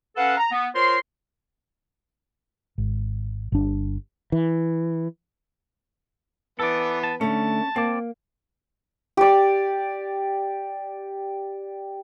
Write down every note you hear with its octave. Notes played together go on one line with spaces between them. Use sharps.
C#4 A4 B4 F5 F#5
A#5
B3
F4 A#4 C5 C#5 C6
G#1
G1 D4
E3
E3 B3 A4 B4 D5
A5
D3 A3 C#4 A5
A#3 C4 D5
G4 D5